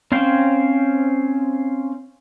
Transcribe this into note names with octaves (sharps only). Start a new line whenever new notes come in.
C4 C#4 C5 F5 G5